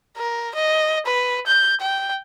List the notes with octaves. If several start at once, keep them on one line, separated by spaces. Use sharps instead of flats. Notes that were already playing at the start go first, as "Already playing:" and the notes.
A#4
D#5
B4
G6
G5